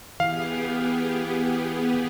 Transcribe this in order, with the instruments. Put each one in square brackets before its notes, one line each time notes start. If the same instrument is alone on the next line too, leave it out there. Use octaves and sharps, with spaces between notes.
[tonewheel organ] E3 [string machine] B3 G4 G#4 [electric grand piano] F5